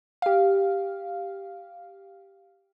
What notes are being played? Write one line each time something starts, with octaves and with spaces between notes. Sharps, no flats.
G4 F5